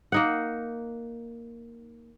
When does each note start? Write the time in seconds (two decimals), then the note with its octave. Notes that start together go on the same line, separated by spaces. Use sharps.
0.12 A#3 D#4 F#5